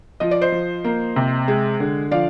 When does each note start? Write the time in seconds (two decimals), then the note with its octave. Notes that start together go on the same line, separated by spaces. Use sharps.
0.20 F3 D#5
0.31 D5
0.41 C5 D#5
0.52 F3
0.84 A#3
1.16 C3
1.48 G#3
1.80 D3
2.11 F3 D5 F5